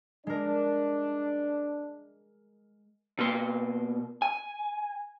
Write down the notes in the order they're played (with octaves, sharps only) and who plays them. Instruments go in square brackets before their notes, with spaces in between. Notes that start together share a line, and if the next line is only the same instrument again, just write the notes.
[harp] G#3 A#4 [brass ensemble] D4
[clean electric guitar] B2 A#3 C6
G#5